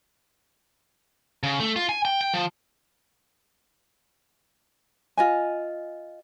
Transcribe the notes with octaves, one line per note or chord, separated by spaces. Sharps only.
C#3
A3
F4
G#5
G5
G5
F3
F4 D#5 G#5